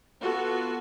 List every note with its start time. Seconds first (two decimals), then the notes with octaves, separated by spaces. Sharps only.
0.22 B3 F4 F#4 A4